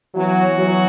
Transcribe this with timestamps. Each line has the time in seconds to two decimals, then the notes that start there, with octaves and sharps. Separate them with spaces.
0.15 E3 F#3 B3 F#4
0.59 F#3